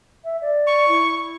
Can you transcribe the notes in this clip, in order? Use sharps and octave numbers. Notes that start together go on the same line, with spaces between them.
E5
D5
C#6
E4